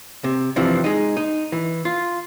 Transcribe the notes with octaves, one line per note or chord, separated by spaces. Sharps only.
C3
C3 E3 F3 C4 D4
G#3 D#4
D#4
E3
F4